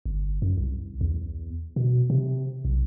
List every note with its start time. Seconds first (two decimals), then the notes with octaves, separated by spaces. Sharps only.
0.06 G1
0.42 F#2
0.58 C2
1.01 E2
1.76 B2
2.10 C3
2.65 B1